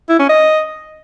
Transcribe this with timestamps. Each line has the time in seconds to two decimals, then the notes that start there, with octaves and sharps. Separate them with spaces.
0.09 E4
0.19 C#4
0.29 D#5